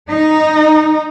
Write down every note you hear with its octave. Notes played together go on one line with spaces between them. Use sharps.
D#4